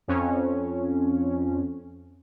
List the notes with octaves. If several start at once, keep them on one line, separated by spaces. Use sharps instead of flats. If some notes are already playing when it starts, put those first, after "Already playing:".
F2 C#4